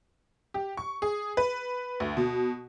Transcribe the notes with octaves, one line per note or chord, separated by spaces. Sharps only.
G4
C#6
G#4
B4
D2
B2